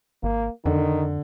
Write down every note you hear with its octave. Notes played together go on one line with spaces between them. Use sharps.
G#1 A#3
F2 D3 D#3